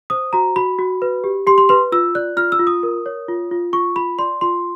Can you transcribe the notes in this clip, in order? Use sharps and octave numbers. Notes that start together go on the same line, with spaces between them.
C5 D#6
F#4 A#5
F#4 B5
F#4
B4
G4
G4 C6
C6
B4 C6
F4 E6
D5 F#6
F4 F6
E6
F4
D#6
A#4
C#5
F4
F4
F4 C#6
F4 B5
D5 C6
F4 C6